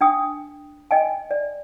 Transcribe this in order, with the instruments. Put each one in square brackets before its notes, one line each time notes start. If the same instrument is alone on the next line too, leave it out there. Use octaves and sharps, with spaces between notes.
[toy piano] D4 G5 D#6
D#5 G5 G#5
D5